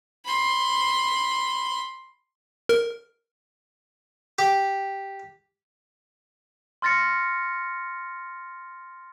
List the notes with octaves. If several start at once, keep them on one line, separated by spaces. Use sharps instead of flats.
B5 C6
A#4
G4
C6 F6 A6 A#6 C#7